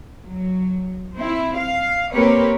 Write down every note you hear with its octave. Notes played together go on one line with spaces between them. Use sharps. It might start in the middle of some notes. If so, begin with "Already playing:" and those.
F#3
C4 E4
F5
A#3 C4 G4 A#4 B4 C#5